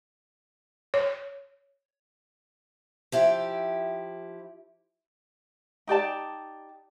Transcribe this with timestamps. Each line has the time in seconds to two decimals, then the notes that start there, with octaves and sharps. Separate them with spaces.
0.94 C#5
3.12 F3 E4 G4
5.87 D#4 G4 D5 A5